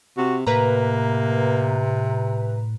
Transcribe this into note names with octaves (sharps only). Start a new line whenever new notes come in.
C3 F#4
A2 C3 A#3 B4 A#5